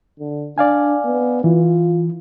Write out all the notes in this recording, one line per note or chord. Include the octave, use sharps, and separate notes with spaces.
D3
D4 D5 F5 G#5
B3
E3 F4